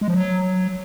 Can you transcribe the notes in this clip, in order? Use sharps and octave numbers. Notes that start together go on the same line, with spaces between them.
G#3
F3
F#3